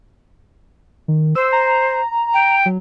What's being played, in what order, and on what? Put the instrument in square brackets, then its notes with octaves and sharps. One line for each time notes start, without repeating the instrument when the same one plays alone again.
[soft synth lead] D#3
[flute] C5 [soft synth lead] E6
[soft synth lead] A#5
[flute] G5
[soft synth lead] F#3